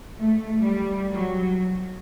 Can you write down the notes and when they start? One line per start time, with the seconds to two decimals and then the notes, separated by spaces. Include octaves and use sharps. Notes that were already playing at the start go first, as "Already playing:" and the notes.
0.16 A3
0.62 G3
1.10 F#3